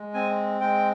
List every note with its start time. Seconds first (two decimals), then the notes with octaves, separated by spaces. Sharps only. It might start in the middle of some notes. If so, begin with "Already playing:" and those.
Already playing: G#3
0.14 C4 G#5
0.61 G#3 G5